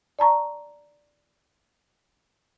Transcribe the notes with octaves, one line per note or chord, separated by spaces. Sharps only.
D5 A5 A#5 C#6